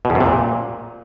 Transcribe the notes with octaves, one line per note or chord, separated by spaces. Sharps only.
B2
E2
F#2
C3
A#2